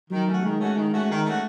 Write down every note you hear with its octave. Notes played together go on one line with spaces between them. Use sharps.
D#3 F#3
A3 C#4 F#4
D#3 G#3
A3 C#4 F#4
D#3
A3 C#4 F#4
D#3
A3 C#4 F#4